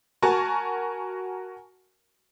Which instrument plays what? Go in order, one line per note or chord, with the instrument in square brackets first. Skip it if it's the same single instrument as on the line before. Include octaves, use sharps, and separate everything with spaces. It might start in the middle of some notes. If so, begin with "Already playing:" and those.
[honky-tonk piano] F#4 A#4 G#5 A5 C#6